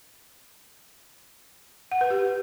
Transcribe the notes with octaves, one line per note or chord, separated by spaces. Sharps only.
F#5
B4
G4